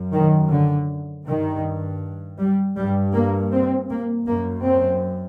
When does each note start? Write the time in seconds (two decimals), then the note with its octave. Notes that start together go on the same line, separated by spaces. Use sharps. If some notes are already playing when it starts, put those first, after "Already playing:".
Already playing: F#2
0.13 D#3
0.51 D3
1.26 G2 D#3
2.39 G3
2.77 G2 G3
3.14 A#3
3.53 C4
3.90 A#3
4.28 F#2 A#3
4.65 C4